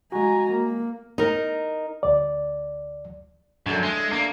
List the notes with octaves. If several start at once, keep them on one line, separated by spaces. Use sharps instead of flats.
G#3 F#4 G#5 A#5
A#3
D#4 A#4
D2 D5
F#2 D4 A4
G#3 E5
A#3 D4